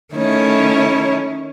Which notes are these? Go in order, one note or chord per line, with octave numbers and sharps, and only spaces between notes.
D#3 A3 C#4 E4 C#5